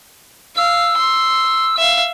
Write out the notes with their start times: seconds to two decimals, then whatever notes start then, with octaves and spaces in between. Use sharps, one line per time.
0.56 F5 E6
0.98 C6
1.78 E5 F5